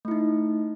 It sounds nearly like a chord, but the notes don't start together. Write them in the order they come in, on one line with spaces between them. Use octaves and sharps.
A3 E4 D#4